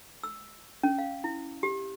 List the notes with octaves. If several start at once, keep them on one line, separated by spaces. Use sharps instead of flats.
E6
C#4
F5
E4
G4